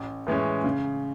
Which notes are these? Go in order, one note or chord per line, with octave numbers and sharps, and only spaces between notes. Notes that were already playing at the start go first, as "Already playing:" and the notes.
Already playing: A1
A2 E3 G#3 C#4
C#3